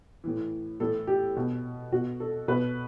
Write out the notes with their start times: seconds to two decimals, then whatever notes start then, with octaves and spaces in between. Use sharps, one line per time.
0.24 A2 E3
0.80 A2 E3 A4
1.07 G4
1.36 B2
1.92 B2 F#4
2.20 A4
2.48 B2 B4